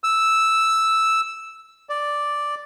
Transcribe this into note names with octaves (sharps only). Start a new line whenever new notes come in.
E6
D5